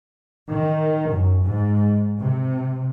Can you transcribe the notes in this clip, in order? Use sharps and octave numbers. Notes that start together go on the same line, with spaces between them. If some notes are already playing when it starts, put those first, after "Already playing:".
D#3
F#2
G#2
C3